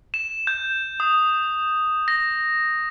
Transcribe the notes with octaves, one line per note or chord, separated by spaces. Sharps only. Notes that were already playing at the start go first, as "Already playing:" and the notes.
E7
G6
D#6
A#6